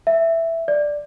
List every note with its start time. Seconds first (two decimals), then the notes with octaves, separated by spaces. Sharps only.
0.07 E5
0.68 D5